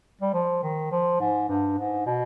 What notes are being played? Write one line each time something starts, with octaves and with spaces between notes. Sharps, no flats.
G3
F3
D#3
F3
G#2
G2
G#2
B2